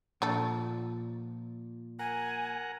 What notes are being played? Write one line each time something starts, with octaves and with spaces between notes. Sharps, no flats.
A#2 F3 A3 D4 A4
A#4 F#5 G#5